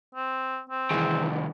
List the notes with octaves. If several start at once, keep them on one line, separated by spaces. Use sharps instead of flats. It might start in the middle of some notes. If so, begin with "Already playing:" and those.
C4
C4
C2 D#3 E3 G#4